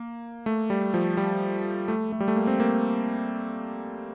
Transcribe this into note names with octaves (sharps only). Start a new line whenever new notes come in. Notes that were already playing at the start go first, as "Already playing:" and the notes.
Already playing: A#3
A3
G3
F3
G3
A3
A3
G3
A3
A#3
C4
A#3